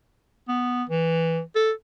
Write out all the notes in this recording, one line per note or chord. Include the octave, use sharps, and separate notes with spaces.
B3
E3
A4